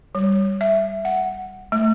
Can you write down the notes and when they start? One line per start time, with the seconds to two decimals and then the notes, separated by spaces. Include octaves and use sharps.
0.15 G3
0.61 E5
1.05 F#5
1.72 A3